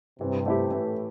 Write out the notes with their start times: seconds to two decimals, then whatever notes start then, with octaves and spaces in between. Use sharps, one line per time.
0.20 G2 C3 E3
0.46 A3 E4 G4
0.71 A2 E3